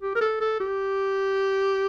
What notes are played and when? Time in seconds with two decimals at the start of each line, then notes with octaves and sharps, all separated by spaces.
0.02 G4
0.16 A#4
0.21 A4
0.41 A4
0.60 G4